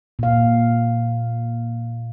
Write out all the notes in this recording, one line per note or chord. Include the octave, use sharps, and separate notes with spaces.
A#2 F5